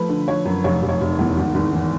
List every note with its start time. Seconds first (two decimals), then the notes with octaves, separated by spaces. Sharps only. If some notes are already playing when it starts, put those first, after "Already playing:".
Already playing: F3 A3 B4
0.09 D3
0.28 F3 C#5
0.45 F#2
0.64 F1 C#5
0.82 F1
0.89 C#5
1.01 F1
1.19 E2
1.38 G#1
1.55 G#1
1.73 E3